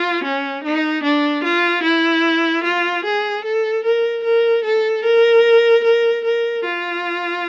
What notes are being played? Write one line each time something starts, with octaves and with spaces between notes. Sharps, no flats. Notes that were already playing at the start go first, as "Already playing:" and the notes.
Already playing: F4
C#4
D#4
D4
F4
E4
F4
G#4
A4
A#4
A#4
A4
A#4
A#4
A#4
F4